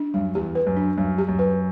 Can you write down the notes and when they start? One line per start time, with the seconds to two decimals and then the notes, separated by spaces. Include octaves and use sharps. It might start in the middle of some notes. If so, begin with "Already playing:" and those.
Already playing: D4
0.14 F#2 G3
0.35 E2 G4
0.55 B4
0.67 F#2
0.77 D4
0.98 F#2 G3
1.18 G4
1.28 F#2
1.39 B4